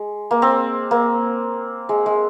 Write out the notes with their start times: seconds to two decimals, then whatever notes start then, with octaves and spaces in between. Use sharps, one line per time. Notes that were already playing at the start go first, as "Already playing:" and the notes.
Already playing: G#3
0.31 A#3
0.42 C4
0.91 A#3
1.89 G#3
2.06 G#3